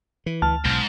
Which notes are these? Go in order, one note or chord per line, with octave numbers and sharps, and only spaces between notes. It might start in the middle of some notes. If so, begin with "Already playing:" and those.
E3
D2 A5 F6
B1 G#2